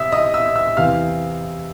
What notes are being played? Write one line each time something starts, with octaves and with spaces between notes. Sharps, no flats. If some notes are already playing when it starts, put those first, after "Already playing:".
Already playing: C3 E5 D#6 E6
D#5 D#6
E5 E6
E5 E6
E2 C3 E3 F5 F6